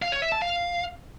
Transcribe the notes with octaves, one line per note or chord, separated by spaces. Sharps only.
F5
C#5
E5
A5
F5